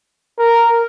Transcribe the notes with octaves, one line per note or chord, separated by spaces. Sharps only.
A#4